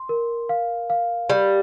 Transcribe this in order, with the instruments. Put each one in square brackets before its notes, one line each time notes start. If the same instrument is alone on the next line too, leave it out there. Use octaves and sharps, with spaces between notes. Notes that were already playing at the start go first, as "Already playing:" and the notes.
Already playing: [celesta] C6
A#4
F5
F5
[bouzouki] G3 [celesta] G4